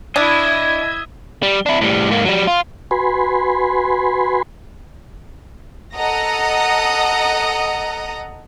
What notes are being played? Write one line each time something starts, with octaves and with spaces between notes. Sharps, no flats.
D4 E4 D#5 E5 G#6
G3
D4 E4
A2 G3
G#2 A#3
F#3 G3
F4
F#4 B4 G#5 B5 C6
A4 D#5 F#5 A#5 D#6 A#6